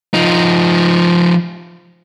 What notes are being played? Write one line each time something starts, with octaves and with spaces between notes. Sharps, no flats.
F3 D#4